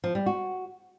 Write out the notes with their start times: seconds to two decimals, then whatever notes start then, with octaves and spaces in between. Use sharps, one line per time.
0.04 F3
0.15 G3
0.26 F#4